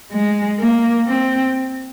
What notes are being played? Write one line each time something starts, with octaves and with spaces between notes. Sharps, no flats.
G#3
A#3
C4